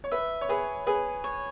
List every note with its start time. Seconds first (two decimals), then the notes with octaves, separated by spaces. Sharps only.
0.04 C#5
0.12 B4 E5
0.41 C#5
0.49 G#4 B4
0.87 G#4 B4
1.24 C#5